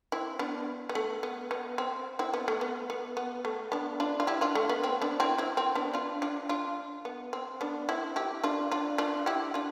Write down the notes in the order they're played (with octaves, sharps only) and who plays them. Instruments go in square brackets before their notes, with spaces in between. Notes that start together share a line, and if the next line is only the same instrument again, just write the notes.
[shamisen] C4 E4
B3 D4
B3
A3
B3
B3
C4
C4 E4
B3
A3
B3
B3
B3
A3
B3 D4
D4 F4
F4
E4 G4
D4 F4
A3
B3
C4
B3 D4
C4 E4
C4 E4
C4
B3 D4
D4 F4
D4 F4
D4 F4
B3
C4
B3 D4
C4 E4
E4 G4
D4 F4
D4 F4
D4 F4
E4 G4
D4 F4